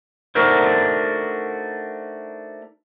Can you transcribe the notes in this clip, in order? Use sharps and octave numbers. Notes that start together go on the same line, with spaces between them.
A3 D4 D#4 F#4 A#4 C5